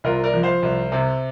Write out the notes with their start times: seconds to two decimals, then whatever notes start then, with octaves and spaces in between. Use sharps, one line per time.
0.04 C2 F4 A#4
0.24 A#4 D5
0.34 F3
0.43 C5 F5
0.62 C2
0.92 C3